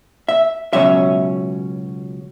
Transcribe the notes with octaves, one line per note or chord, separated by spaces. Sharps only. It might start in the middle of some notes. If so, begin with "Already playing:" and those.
E5
C#2 B2 F#3 C#4 E5